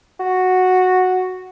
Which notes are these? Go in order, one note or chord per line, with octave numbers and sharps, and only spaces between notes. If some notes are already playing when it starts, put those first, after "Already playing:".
F#4